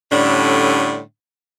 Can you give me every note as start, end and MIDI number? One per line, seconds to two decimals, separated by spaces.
0.11 1.00 45
0.11 1.00 50
0.11 1.00 55
0.11 1.00 61
0.11 1.00 62